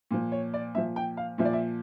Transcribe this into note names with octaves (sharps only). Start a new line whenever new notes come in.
A#2 F3
C#5
D5
A#2 F3 E5
G5
F5
A#2 F3 E5
D5
E5